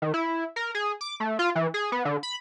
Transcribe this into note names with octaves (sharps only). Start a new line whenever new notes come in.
D#3
E4
A#4
G#4
D6
A3
F4
E3
G#4
B3
D3
B5